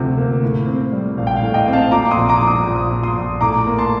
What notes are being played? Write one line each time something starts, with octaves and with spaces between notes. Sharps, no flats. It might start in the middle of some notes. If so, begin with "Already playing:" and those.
Already playing: D2 C3 F3
A#3
A2
C4
G3
A#1 F5
G5
F5
A2
D#5 G5
C4
F5 A5
A#2 A#5 D6
C6 D#6
A#1
A#5 D6
F3
D#6
A#1
D#6
A#2
C6 D#6
A#1
A2 A#5 D6
A#3
A5 C6